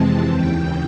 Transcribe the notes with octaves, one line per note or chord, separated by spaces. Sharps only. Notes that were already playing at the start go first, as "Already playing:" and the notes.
Already playing: F2 C3 E3 G#3 C4 A5
D#2 C#3 E3 G5